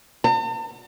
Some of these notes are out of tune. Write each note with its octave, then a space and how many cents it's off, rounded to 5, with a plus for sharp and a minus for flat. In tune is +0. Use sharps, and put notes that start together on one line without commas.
A5 +45